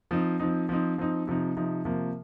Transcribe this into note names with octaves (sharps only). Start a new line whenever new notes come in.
F3 C4 D#4
F3 C4 D#4
F3 C4 D#4
F3 C4 D#4
C3 F3 D#4
C3 F3 D#4
C3 F3 A#3